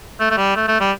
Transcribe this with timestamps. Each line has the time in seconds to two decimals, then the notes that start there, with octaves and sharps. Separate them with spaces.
0.20 A3
0.30 A3
0.38 G3
0.56 A3
0.68 A3
0.80 G3